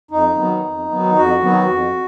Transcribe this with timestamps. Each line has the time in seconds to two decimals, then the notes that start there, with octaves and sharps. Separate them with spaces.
0.11 F2 D#4
0.37 D#3 F#3 B3
0.63 F2
0.89 D#3 F#3 B3
1.15 F2 F#4
1.42 D#3 F#3 B3
1.68 F2